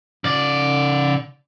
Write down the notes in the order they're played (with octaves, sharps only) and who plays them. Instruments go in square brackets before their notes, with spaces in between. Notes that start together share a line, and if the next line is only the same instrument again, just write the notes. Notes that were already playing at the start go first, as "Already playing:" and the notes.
[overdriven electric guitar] C#3 D5